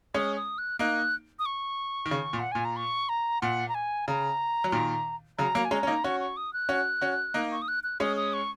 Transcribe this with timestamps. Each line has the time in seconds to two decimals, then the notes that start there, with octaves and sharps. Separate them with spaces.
0.14 G#3 C#4 D#6
0.36 D#6
0.58 F#6
0.79 A#3 D#4 F#6
1.39 D#6
1.46 C#6
2.06 D#3
2.11 C#3
2.33 A#2
2.39 F#5
2.52 A#2 G#5
2.65 A#5
2.76 C#6
3.09 A#5
3.41 A#2 F#5
3.68 A#5
3.74 G#5
4.08 C#3 A#5
4.64 F#3
4.72 A#2 D#3
5.38 C#3 F#3 A#5
5.55 F#3 A#3
5.65 G#5
5.71 G#3 C#4 A#5
5.83 C#4
5.87 A#3 D#4
6.04 C#4 F#4 C#6
6.20 C#6
6.37 D#6
6.53 F#6
6.69 C#4 F#4
7.01 C#4 F#4
7.34 A#3 D#4
7.52 C#6
7.62 D#6
7.68 F#6
7.83 F#6
8.00 G#3 C#4 D#6
8.16 D#6
8.33 C#6